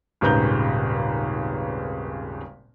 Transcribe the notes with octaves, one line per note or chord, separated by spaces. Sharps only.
D#1 G#1 C#3 B4 A#5 G6